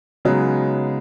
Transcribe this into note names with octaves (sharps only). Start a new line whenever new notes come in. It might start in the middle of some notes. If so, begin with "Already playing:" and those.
C#3 F#3 G#3 B3 D#4 G#4